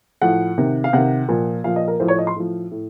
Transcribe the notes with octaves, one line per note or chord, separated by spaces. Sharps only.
A2 F3 F#5
C3 D#3
F5
C3 D#3 F#5
A#2 F3
A#2 F3 F5
D#5
A#4
A2 F3 C5
C#5
D#5
C6
A2 F3
A2